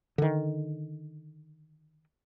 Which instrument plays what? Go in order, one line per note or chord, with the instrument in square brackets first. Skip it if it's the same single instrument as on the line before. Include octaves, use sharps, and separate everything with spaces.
[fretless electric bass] D3 D#3